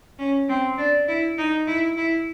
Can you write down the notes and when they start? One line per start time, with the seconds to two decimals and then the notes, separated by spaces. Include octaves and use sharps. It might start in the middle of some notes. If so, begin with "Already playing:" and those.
0.19 C#4
0.48 C4
0.78 D4
1.08 E4
1.38 D#4
1.67 E4
1.97 E4